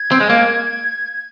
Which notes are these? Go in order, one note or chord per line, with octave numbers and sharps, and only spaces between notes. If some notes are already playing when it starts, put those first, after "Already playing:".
Already playing: G#6
C4
G#3
A#3
G#6